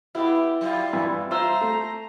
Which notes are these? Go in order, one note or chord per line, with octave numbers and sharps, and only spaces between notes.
B3 E4 G4
F#3 G3 F4
G2 E3
F4 C5 E5 A#5 E6
A3